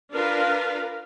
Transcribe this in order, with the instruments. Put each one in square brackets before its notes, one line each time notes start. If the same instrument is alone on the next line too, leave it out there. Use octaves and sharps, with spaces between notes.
[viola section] D4 F4 A#4 B4 F5